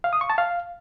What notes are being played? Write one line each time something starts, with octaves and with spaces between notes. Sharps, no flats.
F5
D#6
C#6
A5
F5